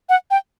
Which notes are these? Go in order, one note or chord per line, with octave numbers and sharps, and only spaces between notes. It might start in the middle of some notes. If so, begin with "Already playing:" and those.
F#5
G5